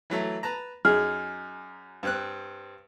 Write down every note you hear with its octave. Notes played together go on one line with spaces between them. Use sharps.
E3 F#3 A3
B4 A5 A#5
F#2 D#4 G#4 F6
G2 C4 F#6